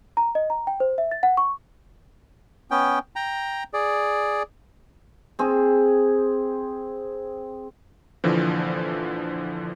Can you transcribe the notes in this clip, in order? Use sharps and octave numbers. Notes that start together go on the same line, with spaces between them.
A#5
D#5
A#5
G5
C5
E5
A6
F#5
C#6
B3 C#4 G5
G5 A#5
G#4 D5
C4 G#4
A#1 D3 E3 F3